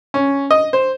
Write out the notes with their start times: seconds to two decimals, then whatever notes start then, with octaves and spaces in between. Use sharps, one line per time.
0.14 C#4
0.51 D#5
0.73 C5